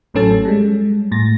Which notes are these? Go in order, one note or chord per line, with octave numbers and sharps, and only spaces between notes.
A1 A2 F#3 C#4 A4 A5
G3 G#3
A2 A6 A#6